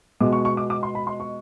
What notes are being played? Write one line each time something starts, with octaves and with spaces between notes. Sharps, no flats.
B2 G#3 B3 D6
C#6
C#6
D6
D6
C6
B5
C6
C#6